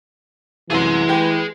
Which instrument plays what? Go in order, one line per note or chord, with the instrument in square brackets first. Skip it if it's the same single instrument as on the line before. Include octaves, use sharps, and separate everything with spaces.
[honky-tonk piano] C2 F#2 C3 [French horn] E3 [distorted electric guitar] G#4 C6
[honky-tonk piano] G4 B4 G5